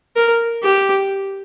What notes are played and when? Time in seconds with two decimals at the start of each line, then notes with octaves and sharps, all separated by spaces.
0.16 A#4
0.63 G4